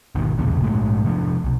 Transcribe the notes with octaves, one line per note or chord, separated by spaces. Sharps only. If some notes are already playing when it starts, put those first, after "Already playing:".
G#1 D#2 B2 D#3
B1 E2 A#2 C#3
A#1 G#2 A3
C3 F3 D4
B1